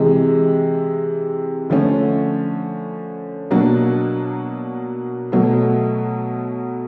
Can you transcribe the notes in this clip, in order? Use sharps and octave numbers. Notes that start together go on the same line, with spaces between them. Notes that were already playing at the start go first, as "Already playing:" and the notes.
Already playing: C3 E3 G#3
D3 F3 A3 C#4
B2 F#3 A#3 D4 F#4
B2 F#3 A3